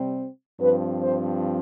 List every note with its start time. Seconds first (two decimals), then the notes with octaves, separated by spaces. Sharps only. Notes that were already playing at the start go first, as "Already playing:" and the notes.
Already playing: C3 G3 C4
0.60 G2 F3 C4 B4
1.01 C5